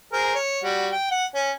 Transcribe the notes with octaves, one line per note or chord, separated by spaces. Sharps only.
G#4 A#4 C5
C#5
G3 F#4
G5
F#5
C#4